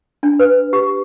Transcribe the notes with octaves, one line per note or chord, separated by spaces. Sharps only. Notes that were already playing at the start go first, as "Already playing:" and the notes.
D4
B4
G4